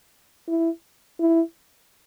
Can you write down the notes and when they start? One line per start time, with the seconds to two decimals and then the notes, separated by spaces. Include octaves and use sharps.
0.48 E4
1.20 E4